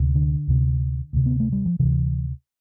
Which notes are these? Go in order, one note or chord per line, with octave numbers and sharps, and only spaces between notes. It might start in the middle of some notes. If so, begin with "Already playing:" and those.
Already playing: D2 C3
D3
D2 C3
D2 C3
B3
A3
G3
F3
D2 C3 E3